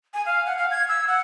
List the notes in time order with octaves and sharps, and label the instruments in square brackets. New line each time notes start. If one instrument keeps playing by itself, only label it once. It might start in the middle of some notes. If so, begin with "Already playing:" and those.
[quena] G#5
F5
F#5
F5
G#6
E6
F#5